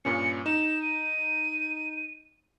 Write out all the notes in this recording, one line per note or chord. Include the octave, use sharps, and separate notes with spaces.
G2 A#2 C#4 C#7
D#4 E7
D#7